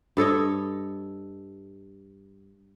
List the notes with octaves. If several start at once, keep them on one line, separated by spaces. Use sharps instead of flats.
G2 A4 C#5 D#5